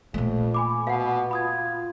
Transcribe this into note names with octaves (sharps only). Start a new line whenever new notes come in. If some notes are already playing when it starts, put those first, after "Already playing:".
F2 A#2 A3
G#5 B5 D6
B2 F5 F#5
F4 B5 D#6 G#6